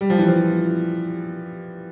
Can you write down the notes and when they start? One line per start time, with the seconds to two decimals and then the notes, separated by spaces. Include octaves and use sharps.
0.01 G3
0.10 F3
0.19 E3
0.28 F3